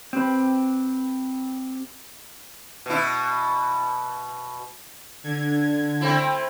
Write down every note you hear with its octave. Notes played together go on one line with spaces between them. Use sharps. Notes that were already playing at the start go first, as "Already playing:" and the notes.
C4 G4 B4
B2 E4
D3 G#6
A3 C4 E4